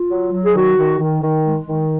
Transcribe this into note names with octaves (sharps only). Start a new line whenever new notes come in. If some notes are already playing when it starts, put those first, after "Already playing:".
Already playing: F4
F#3
F#3
G#4
D#3 F#4
D#3
D#3
D#3
G#3
D#3